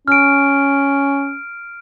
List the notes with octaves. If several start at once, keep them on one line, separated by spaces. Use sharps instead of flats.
C#4 F6 D7